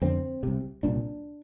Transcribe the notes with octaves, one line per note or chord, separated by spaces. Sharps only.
F2 D3 C4
C2 C3
C2 A#2 D4